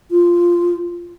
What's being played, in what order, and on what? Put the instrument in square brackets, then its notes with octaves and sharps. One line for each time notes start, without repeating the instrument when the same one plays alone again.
[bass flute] F4